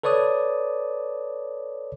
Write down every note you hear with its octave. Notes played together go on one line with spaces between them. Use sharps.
A4 B4 C#5 D5 D#6